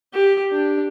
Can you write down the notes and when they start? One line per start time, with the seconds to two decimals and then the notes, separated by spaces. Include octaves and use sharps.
0.14 G4
0.52 D4